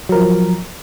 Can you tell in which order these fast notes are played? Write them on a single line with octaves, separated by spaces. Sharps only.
F#3 A#4 F3